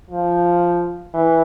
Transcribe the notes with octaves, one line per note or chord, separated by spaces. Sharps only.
F3
E3